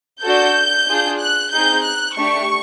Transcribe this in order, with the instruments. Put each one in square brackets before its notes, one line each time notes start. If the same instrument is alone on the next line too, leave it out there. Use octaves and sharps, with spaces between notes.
[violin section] D4 F#4 A4 G6
D4 F4 G#4
F#6
C4 D#4 G#4 G6
F#6
A3 D4 G4 C#6